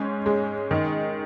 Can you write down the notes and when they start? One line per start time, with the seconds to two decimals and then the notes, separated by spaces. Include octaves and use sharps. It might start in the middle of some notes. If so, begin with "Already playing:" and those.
Already playing: G#2 C#4
0.26 G#3
0.71 D#3